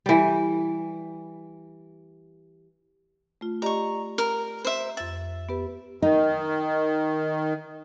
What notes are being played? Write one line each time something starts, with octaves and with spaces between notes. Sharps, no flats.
E3 G3
A3 F4
G4 D5 D#5 A#5 C#6
A#4
C5 E5
F2 E5 A6
B3 G4 B4
D#3 D#4